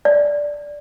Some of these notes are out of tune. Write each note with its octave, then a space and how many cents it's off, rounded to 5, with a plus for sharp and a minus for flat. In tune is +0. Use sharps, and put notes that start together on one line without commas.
D5 -5